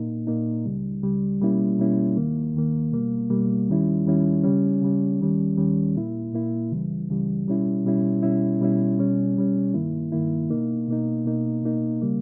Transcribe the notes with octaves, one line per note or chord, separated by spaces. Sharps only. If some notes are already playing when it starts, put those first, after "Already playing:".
Already playing: A#2 A#3 D#4
A#2 A#3 D#4
C#2 C#3 G3
C#2 C#3 G3
B2 G3 A#3 C#4 E4
B2 G3 A#3 C#4 E4
D#2 D#3 A#3
D#2 D#3 A#3
B2 G3 A#3
B2 G3 A#3
D#2 D#3 G3 C#4 E4
D#2 D#3 G3 C#4 E4
C#3 G3 C#4
C#3 G3 C#4
D#2 D#3 G3 C#4
D#2 D#3 G3 C#4
A#2 A#3 E4
A#2 A#3 E4
C#2 C#3 E3 G3
C#2 C#3 E3 G3
B2 G3 C#4 E4
B2 G3 C#4 E4
B2 G3 C#4 E4
B2 G3 C#4 E4
B2 G3 C#4
B2 G3 C#4
G2 D#3 A#3 E4
G2 D#3 A#3 E4
B2 A#3 D#4
B2 A#3 D#4
B2 A#3 D#4
B2 A#3 D#4
C#3 G3 A#3